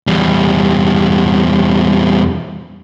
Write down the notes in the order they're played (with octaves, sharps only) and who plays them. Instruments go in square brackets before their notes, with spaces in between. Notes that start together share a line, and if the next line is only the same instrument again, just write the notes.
[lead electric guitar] E2 G3